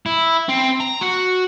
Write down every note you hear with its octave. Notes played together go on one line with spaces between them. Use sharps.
E4
C4
A#5
F#4